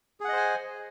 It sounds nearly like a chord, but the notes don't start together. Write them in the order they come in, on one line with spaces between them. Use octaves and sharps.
G#4 F#5 D#5 C5 G#5